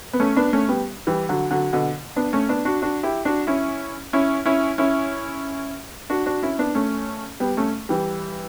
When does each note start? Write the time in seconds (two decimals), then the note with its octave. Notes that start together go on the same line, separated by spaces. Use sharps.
0.13 B3
0.20 A3 C#4
0.36 B3 D4
0.53 A3 C#4
0.68 G3 B3
1.07 E3 G3
1.29 D3 F#3
1.51 D3 F#3
1.73 B2 D3
2.16 B3 D4
2.33 A3 C#4
2.49 B3 D4
2.65 D4 F#4
2.82 D4 F#4
3.03 E4 G4
3.25 D4 F#4
3.47 C#4 E4
4.13 C#4 E4
4.46 C#4 E4
4.78 C#4 E4
6.10 D4 F#4
6.26 D4 F#4
6.43 C#4 E4
6.59 B3 D4
6.75 A3 C#4
7.40 G3 B3
7.57 A3 C#4
7.89 E3 G3